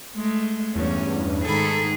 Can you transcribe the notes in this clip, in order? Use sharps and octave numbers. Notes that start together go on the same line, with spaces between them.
G#3 A3
E2 G2 C#4
G#2 D#3 G#4 A4 B5